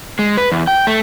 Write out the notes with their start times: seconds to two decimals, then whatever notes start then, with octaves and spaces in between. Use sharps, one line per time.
0.19 G#3
0.37 B4
0.52 E2
0.67 G5
0.87 A3